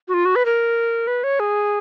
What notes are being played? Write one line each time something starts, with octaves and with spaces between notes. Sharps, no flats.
F#4
F4
F#4
B4
A#4
B4
C#5
G#4